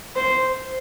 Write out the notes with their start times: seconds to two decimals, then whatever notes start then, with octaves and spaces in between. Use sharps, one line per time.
0.16 C5